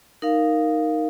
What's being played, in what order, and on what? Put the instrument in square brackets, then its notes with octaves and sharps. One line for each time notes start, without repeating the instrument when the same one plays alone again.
[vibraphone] D#4 A#4 F5